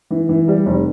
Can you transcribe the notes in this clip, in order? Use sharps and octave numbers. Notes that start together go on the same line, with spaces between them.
E3
E3
G3
F1